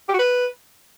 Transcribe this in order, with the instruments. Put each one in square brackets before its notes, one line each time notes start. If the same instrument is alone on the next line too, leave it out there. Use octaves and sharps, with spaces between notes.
[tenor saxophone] G4
F#4
B4